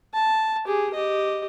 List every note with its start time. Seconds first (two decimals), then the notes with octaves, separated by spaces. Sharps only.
0.14 A5
0.65 G4 G#4
0.94 G4 D#5